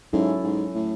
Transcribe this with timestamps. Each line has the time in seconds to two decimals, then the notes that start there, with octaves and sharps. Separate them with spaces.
0.13 G#2 F#3 C#4 E4 A4
0.44 G#2
0.75 A2